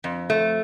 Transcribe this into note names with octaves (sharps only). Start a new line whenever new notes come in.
F2
A3